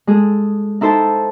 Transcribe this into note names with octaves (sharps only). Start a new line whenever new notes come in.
G#3 G#4 A4
D#4 E4 A4 C5 A5